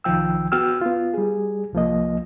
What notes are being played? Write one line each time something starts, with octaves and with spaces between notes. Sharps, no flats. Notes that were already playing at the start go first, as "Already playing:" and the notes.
C2 D#3 F3 G5 E6
B3 F#4 G5 E6 F6
B3 F4
G3 G#4
C2 F3 A#3 D#5